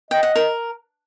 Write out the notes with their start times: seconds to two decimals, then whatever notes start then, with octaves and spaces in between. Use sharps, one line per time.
0.11 D#5 G5
0.23 F#5
0.35 A#4